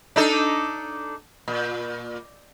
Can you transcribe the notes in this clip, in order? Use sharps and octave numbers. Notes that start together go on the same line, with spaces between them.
D4 D#4 A4
A#2